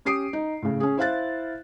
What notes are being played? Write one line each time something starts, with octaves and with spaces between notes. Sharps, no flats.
C#4 G4 D#6 C7 D7
D#4
A2 C#3
C#4 G#4
E4 C5 F5 F#6 A6